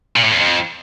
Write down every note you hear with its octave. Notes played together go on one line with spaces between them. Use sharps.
A#2
A2
E2
F2